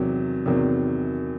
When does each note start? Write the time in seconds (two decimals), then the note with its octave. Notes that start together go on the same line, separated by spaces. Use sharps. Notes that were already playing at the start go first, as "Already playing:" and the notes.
Already playing: E2 C3 D#3 F#3
0.45 E2 C3 D#3 F#3